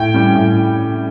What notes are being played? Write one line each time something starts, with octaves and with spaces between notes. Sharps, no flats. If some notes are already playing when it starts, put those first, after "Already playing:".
Already playing: A2 G5
G3 C#4
A2